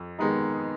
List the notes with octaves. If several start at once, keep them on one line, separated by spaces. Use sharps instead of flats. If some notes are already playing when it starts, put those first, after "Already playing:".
Already playing: F2
D#3 G#3 B3 D#4